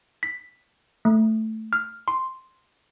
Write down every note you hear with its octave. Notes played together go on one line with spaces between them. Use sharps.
B6
A3
F6
C6